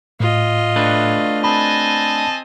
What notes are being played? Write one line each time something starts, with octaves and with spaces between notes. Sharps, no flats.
A2 F4 D#5
A3 D4 B4
C4 D#5 G#5 A5 B5